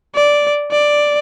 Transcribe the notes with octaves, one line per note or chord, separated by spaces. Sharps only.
D5
D5